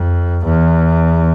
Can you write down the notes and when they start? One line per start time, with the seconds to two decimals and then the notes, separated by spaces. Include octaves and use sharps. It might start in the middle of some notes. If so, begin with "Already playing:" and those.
Already playing: F2
0.45 E2